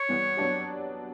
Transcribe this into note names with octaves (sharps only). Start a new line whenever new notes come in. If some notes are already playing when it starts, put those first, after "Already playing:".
Already playing: C#5
E3 G3 B3
F#3 B3 D4 G4